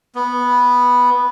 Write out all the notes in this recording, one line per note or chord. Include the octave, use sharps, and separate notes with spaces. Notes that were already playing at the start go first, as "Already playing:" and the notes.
B3